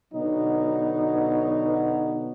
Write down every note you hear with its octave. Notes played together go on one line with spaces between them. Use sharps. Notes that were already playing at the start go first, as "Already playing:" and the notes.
B2 D3 F#3 B3 D#4